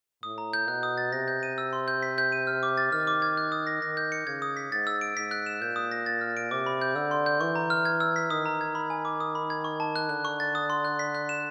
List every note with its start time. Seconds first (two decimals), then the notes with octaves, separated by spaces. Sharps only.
0.23 A2 D#6
0.38 A#5
0.53 G6
0.68 B2 F#6
0.83 D#6
0.98 A6
1.12 C3 A#6
1.28 G6
1.43 D#7
1.58 E6
1.73 C6
1.88 G6
2.03 B6
2.18 G6
2.32 D#7
2.47 F6
2.63 D6
2.77 A6
2.92 D#3 F6
3.07 D6
3.22 G#6
3.37 F#6
3.52 D#6
3.67 A#6
3.82 D#3 A#6
3.97 G6
4.12 C#7
4.26 C#3 G#6
4.42 D#6
4.57 B6
4.71 G#2 A6
4.87 E6
5.01 D7
5.17 G#2 B6
5.31 F#6
5.46 E7
5.61 A#2 G6
5.76 D#6
5.91 A#6
6.06 A6
6.21 F6
6.37 D7
6.51 C3 D6
6.66 B5
6.82 G6
6.95 D3 E6
7.11 C6
7.26 G6
7.41 E3 C#6
7.55 A#5
7.70 F6
7.85 G#6
8.00 E6
8.16 B6
8.30 D#3 D#6
8.46 A#5
8.61 G#6
8.75 B5
8.90 G#5
9.05 D6
9.20 D#6
9.35 B5
9.50 G#6
9.64 C#6
9.80 A5
9.96 F#6
10.09 D3 F#6
10.25 C#6
10.40 A6
10.55 D#6
10.70 C6
10.85 F#6
10.99 B6
11.15 F#6
11.29 E7